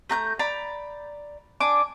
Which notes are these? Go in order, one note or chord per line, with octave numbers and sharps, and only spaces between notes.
A3 A#5 F#6 G6
D5 A#5 B5
D4 G#5 D6